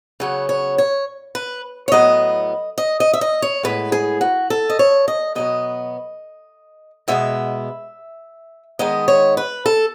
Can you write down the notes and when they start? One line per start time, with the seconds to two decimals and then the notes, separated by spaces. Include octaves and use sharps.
0.20 C#3 F#3 B3 C#5
0.49 C#5
0.78 C#5
1.35 B4
1.88 C#5
1.92 A2 F#3 B3 D#5
2.78 D#5
3.00 D#5
3.13 E5
3.21 D#5
3.42 C#5
3.63 A2 G#3 B3 B4
3.92 G#4
4.21 F#4
4.50 A4
4.70 D#5
4.79 C#5
5.08 D#5
5.35 B2 F#3 B3 D#5
7.08 B2 G#3 B3 E5
8.79 D#3 G#3 B3 D#5
9.08 C#5
9.37 B4
9.66 A4